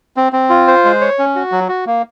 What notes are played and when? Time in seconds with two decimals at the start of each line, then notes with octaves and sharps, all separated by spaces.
0.17 C4
0.33 C4
0.50 F4
0.67 C5
0.85 G#3
1.01 C#5
1.19 C#4
1.35 F#4
1.52 F#3
1.69 F#4
1.86 A#3